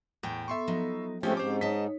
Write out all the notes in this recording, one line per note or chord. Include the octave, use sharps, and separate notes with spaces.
E2 A2 G5
B3 A4 E5 C6 C#6
F3 F#3 D#4
G#2 F3 A3 C4 C#4 G4
G#2 C4 C#4 C5 D6
D#4 C#5 D#5 A5 B6